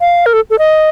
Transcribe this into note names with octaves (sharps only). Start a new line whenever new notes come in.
F5
A#4
A4
A4
D#5